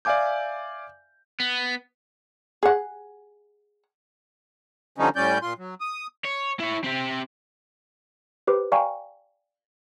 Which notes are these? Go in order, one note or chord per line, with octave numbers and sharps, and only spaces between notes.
D5 E5 F5 G#5 D6 G6
B3
G#4 F#5
D3 F3 G3 A3 C#4 D#4
A2 G3 C#4 D5 G6
A#2 F4 C6
F#3
D#6
C#5
E4 C#5
C4 G4
G4 B4 C5 D6
D5 F5 G5 G#5 A#5 C#6